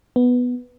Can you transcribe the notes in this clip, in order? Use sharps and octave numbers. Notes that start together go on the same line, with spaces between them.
B3